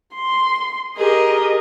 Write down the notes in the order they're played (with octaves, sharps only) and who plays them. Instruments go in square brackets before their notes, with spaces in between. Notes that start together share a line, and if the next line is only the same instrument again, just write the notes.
[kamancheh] C6
[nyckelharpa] G4 G#4 [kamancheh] A#4 D#5